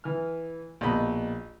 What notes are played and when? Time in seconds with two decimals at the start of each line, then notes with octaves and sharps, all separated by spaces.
0.04 E3 F6
0.81 A#1 B2 D#5 B5